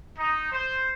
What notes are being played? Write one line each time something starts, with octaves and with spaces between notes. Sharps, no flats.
D#4
C5